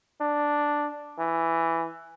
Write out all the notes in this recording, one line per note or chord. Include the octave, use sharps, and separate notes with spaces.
D4
E3